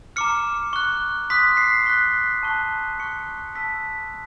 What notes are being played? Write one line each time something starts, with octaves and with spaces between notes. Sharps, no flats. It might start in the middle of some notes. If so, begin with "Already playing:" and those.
A#5 D6 F6 C#7
C#6 F#6
C6 D#6 F#6 B6
C7
C#6 F#6 B6
A5 C#6 F#6
C#6 F#6 C#7
A5 C#6 E6 B6